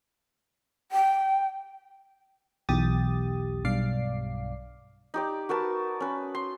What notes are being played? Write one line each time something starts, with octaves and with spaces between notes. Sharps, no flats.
G5
B1 E2 G4 D#6 A6
B1 G2 D5 F5 D6 C7
D#4 G4 D5
F#4 A#4 B4 A5
C#4 B4
C6